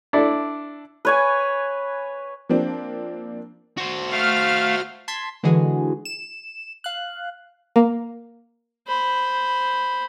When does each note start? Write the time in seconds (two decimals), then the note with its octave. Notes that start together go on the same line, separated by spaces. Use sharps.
0.13 D4 E4 A4 D5
1.05 B4 C#5 G#5
2.49 F3 A#3 C4 D4
3.78 F#4 C5
4.12 A3 F5 F6
5.08 A5 C6 G#6 B6
5.43 D3 E3 G#3 F#4 G#4
6.05 E7
6.84 F5 F#6
7.76 A#3
8.88 C5 B5